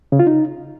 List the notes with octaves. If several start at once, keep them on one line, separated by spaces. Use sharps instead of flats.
C#3
F4
D#4